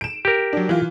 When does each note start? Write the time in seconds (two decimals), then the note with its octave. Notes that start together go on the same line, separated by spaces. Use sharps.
0.01 D7 E7
0.25 G4 A#4
0.53 F#3 D4
0.69 E3 F4